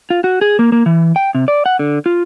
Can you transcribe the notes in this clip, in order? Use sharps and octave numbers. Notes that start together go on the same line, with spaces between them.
F4
F#4
G#4
A#3
A#3
E3
G5
C3
D5
F#5
D3
F4